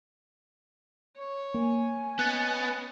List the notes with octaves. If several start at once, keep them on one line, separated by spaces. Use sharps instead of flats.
C#5
A#3 G#5
B3 C#4 D#5 F#6 A6